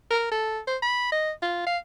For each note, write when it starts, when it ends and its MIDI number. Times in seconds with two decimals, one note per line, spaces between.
0.10 0.27 70
0.31 0.59 69
0.67 0.77 72
0.82 1.11 83
1.12 1.31 75
1.42 1.64 65
1.66 1.77 77